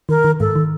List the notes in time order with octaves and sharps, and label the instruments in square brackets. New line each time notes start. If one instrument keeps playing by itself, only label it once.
[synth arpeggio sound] D#3 [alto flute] A#4
[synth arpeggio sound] D#3
[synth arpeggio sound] G#2 [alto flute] A4
[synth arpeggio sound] D#3